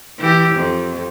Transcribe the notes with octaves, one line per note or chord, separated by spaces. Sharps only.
E3 G4
F2